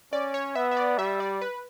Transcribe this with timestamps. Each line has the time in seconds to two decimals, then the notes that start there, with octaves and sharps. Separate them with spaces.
0.13 C#4 D5
0.34 C#5
0.56 B3 E5
0.71 E5
0.77 D5
0.98 G3 E5
1.20 D5
1.42 B4